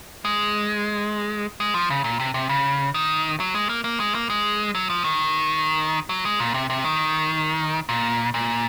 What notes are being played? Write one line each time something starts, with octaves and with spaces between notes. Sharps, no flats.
G#3
G#3
F3
C#3
A#2
C3
C3
C#3
D#3
F#3
G#3
A#3
A#3
G#3
A#3
G#3
F#3
F3
D#3
F#3
G#3
A#2
C3
C3
D#3
A#2
A#2